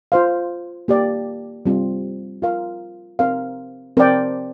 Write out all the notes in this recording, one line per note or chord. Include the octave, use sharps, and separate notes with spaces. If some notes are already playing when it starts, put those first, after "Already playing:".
F4 C5 F5
A#3 G4 D5
G3 C4 F4 C5
F4 A#4 F5
C4 A#4 F5
C4 A#4 D5 G5